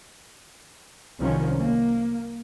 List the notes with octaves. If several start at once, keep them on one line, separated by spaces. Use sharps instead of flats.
C2 D#3 F3 F#3 C#4
A#3